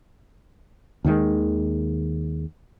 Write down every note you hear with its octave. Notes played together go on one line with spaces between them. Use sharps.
D#2 D#3 E3 G#3